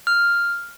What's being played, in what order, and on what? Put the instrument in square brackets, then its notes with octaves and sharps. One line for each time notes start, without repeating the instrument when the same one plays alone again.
[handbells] F6